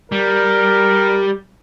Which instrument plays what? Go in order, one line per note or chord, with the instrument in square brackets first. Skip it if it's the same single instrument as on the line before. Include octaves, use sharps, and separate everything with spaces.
[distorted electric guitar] G3 [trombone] A#4